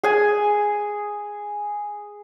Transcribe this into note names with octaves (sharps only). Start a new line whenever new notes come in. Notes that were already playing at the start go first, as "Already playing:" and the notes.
G#4 G#5